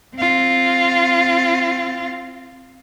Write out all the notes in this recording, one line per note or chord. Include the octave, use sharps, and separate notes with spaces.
C4 F4